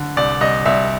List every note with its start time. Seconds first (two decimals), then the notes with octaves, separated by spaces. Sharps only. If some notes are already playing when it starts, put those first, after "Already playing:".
Already playing: D3
0.17 C2 D5
0.41 C2 D#5
0.65 C2 E5